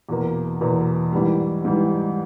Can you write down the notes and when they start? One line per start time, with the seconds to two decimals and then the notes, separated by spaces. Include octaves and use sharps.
0.09 E2 B2 A#3
0.61 E2 B2 A#3
1.13 G#2 E3 G3
1.65 G#2 E3 G3